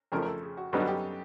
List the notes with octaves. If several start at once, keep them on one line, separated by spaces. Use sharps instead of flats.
F2 C#3 F3 A3 A#4
A#4
A4
G#4
F#4
F#2 D3 G3 B3 D#4 G4
F#4
G4